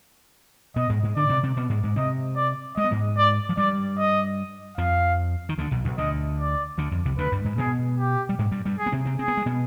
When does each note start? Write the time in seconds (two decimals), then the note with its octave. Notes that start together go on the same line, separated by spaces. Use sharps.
0.76 B2 B3 D#5
0.90 G#2 G#3
1.03 G#2 G#3
1.16 D3 D4 D5
1.29 C3 C4
1.43 C3 C4
1.56 B2 B3
1.69 G#2 G#3
1.83 G#2 G#3
1.96 C3 C4 D#5
2.37 D5
2.77 G#3 D#5
2.84 B3
2.91 G#2 G#3
3.18 D5
3.49 F3
3.57 G2 G3 D5
3.98 D#5
4.77 F2 F3 F5
5.49 D#3
5.58 D2 D3
5.71 B1 B2
5.85 B1 B2
5.98 D2 D3 D#5
6.39 D5
6.78 D2 D3
6.91 F2
7.05 C2 C3
7.18 D2 D3 B4
7.32 G2 G3
7.44 G#2 G#3
7.58 B2 B3 G#4
7.99 G4
8.29 G3
8.39 G#2 G#3
8.52 G2 G3
8.65 G2 G3
8.79 G#4
8.86 B3
8.92 C3 C4
9.05 C3 C4
9.19 C4 G#4
9.28 B3
9.37 G#3
9.46 B2 B3